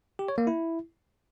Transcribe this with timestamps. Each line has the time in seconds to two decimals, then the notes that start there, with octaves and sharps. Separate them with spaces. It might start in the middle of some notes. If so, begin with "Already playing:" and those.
0.19 G4
0.28 C#5
0.38 A#3
0.47 E4